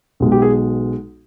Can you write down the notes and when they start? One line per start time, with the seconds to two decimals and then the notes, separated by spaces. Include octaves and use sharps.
0.20 B1 B2 G#3
0.32 G4
0.42 G#4